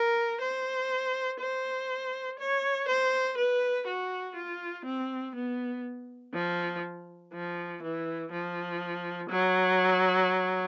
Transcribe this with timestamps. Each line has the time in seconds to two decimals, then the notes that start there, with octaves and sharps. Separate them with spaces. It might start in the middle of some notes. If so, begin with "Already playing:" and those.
Already playing: A#4
0.41 C5
1.40 C5
2.39 C#5
2.88 C5
3.37 B4
3.87 F#4
4.36 F4
4.85 C4
5.35 B3
6.34 F3
7.33 F3
7.83 E3
8.32 F3
9.30 F#3